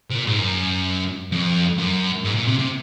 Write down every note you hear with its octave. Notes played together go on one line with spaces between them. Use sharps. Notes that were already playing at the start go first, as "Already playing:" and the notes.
C3
A#2
G#2
F#2
F2
F#2
G#2
A#2
C3
C3